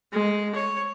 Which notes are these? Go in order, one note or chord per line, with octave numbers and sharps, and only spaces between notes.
G#3
C#5